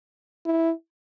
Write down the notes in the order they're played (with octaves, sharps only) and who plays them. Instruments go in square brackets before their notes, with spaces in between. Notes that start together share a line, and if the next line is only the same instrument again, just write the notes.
[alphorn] E4